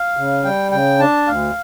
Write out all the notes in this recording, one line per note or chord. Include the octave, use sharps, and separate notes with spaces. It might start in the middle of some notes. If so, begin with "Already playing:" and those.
Already playing: F5
C#3
G3 G5
C#3 G5
D4 A5
D2 F5